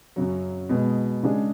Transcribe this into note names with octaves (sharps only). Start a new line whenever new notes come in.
F#2 C#3 F#3
B2 G#3 B3
C#3 G#3 D4 G#4